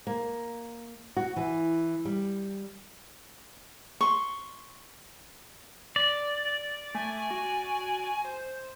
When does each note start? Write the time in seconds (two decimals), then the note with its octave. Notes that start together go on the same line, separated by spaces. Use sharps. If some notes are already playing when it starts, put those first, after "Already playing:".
0.07 A#3
1.17 F#4
1.36 E3
2.05 G3
4.01 C6 C#6
5.96 D5
6.95 A3 G#5
7.31 F#4
8.25 C5